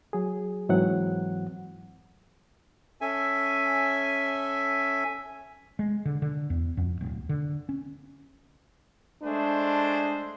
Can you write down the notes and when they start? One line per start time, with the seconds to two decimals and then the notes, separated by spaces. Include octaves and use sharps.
0.13 F#3 G#4
0.69 G#2 E3 F#3 C4 F#5
3.01 C#4 A4 E5 G#5
5.79 G#3
6.05 D3
6.22 D3
6.50 E2
6.77 F2
7.01 D1
7.29 D3
7.69 C#4
9.23 G#3 A3 D4 G#4 C5